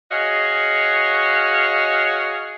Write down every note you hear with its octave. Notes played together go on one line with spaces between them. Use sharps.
F#4 G#4 C#5 D#5 F5